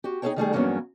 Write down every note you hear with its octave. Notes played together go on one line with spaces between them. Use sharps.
F#4 G4
D#4 G#4 A4 C5 C#5 G5
D#3 G3 A3 G#4
E2 G2 F#3 A#3 B3 C#4